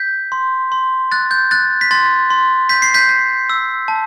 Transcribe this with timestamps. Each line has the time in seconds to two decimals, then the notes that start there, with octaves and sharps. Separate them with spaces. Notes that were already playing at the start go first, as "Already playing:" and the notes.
Already playing: G6 B6
0.32 C6
0.72 C6
1.12 F#6 A6
1.31 G6
1.51 F#6 A6
1.81 B6
1.91 C6 A6
2.30 C6
2.69 G6 B6
2.82 C7
2.94 G6 B6
3.09 G6
3.50 E6
3.88 A5